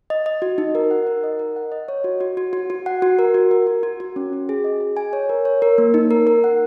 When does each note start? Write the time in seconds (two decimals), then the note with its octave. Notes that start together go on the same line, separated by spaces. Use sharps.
0.10 D#5
0.26 D#5
0.42 F#4
0.58 D#4
0.75 A#4
0.91 F#5
1.07 A#4
1.24 D#5
1.39 A#4
1.56 F#5
1.72 D#5
1.88 C#5
2.04 F#4
2.20 F#4
2.37 F#4
2.53 F#4
2.70 F#4
2.86 F#5
3.02 F#4
3.19 A#4
3.34 F#4
3.51 A#4
3.67 F#4
3.83 F#4
4.00 F#4
4.16 C#4
4.33 F#4
4.49 G#4
4.64 D#5
4.81 G#4
4.97 G#5
5.13 C#5
5.29 A#4
5.45 C#5
5.62 A#4
5.78 A#3
5.94 D#4
6.11 A#4
6.27 A#4
6.44 F#5